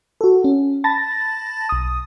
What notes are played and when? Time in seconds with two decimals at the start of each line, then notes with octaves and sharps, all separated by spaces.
0.21 F#4 A4
0.44 C#4
0.84 A5 B5 A6 A#6
1.69 B1 D#6